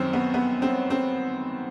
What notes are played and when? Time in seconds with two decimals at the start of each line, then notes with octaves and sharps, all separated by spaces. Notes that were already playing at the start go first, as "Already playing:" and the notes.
Already playing: F#2 D#3 C4 C#4
0.13 B3
0.34 B3
0.62 C4
0.90 C4